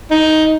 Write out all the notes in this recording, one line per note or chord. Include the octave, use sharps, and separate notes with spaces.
D#4